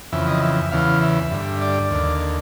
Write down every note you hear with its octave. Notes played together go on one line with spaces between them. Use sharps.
F2 C#3 E3 E5
D#5
E5
E2 C#3 E3 F5
E5
G2 D3
D5
D#2 D3